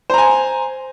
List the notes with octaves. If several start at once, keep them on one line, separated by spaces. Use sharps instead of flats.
C5 G#5 A#5